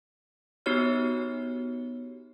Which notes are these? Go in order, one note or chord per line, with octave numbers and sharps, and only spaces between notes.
B3 D#4 F#4 G4 C#5 F6